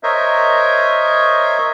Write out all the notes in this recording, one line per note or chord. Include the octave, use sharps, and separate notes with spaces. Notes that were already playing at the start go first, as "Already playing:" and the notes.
A#4 C5 C#5 D#5 E5